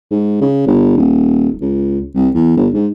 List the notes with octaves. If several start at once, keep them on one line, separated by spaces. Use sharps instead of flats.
G#2
C#3
G1
D#1
C#2
C2
E2
G1
G#2